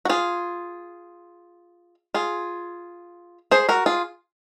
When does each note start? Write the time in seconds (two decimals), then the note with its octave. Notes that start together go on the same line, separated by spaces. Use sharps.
0.05 F#4
0.09 F4 G#4
2.14 F4 G#4
3.51 G#4 C5
3.69 F#4 A#4
3.86 F4 G#4